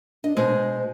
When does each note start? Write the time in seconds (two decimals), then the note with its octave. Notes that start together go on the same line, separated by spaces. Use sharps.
0.24 D4 D#5
0.37 B2 G#3 C5